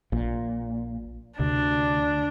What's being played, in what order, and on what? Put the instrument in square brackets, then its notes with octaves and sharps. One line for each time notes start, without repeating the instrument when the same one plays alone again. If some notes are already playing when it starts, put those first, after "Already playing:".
[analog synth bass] A#1 [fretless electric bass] A#2
[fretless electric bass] D2 [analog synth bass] C3 [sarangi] D4